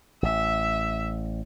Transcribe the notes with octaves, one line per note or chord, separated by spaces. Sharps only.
A1 E5